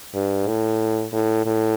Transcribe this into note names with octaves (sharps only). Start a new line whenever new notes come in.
G2
A2
A2
A2